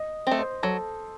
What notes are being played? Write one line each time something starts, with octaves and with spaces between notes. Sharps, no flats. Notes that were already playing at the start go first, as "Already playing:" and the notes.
Already playing: D#5
A3 C4
C5
F#3 A4